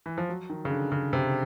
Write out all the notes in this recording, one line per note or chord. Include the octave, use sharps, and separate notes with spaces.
E3
F3
F#3
D#3
C#3
D3
C#3
C3